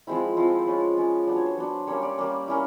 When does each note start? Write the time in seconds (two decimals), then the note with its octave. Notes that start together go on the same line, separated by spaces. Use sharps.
0.07 F3 G#3 C4 E4
0.36 F3 G#3 C4 E4
0.59 C5
0.67 G#3 C#4 F4 B4
0.97 G#3 C#4 F4
1.27 F#3 B3 D4 C5
1.36 C#5
1.46 C5
1.57 F#3 B3 D4
1.87 G3 A#3 C#4 C#5
2.03 D5
2.18 G3 A#3 C#4
2.48 A#3 C#4 E4